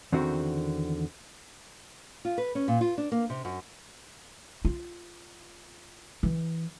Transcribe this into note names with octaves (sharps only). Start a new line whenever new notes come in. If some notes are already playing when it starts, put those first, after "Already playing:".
E2 D3 D#3 C4 F#4
F4
B4
C#4
A#2
F4
D4
A#3
C3
F#2
F4
E3